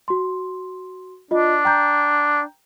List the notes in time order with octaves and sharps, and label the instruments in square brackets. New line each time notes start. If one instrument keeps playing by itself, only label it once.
[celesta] F#4 C6
[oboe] D4 [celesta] F4 D#5
[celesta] G5 A#5 G6